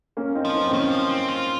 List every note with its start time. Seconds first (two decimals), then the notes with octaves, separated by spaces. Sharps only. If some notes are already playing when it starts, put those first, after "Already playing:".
0.17 A#3 C#4
0.35 C4 D#4
0.45 F3
0.54 C4 D#4
0.67 C4
0.72 D#3 A#3 C#4
0.91 F3
1.10 C4
1.29 F4